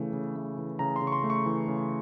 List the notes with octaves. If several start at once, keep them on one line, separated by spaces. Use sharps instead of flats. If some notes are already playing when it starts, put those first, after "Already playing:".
Already playing: C#3 E3 A3
C#3
A3
E3
C#3 A#5
C6
C#3
C#6
C6
A3
C#6
E3
C#3